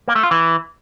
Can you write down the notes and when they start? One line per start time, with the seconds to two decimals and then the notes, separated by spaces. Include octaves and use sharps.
0.08 A#3
0.15 A3
0.23 F4
0.31 E3